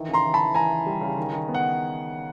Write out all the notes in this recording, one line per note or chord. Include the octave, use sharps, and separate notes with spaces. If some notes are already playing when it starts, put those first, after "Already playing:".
Already playing: D#3 E3
C#3
A#5 C6
E3
A5 B5
E3
E3 G#5 A#5
E3
G3
C#3
D#3
D#3
B3
F#5